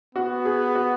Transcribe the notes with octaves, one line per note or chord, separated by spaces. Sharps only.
B3 F#4
G#4
F#4